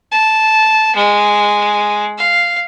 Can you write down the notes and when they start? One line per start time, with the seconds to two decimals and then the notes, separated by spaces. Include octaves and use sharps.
0.11 A5
0.96 G#3
2.18 F5